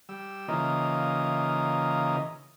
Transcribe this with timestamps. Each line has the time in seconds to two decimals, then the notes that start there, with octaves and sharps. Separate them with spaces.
0.09 G3 E6
0.48 C#3 E3 A#3 D#4 F4 D#5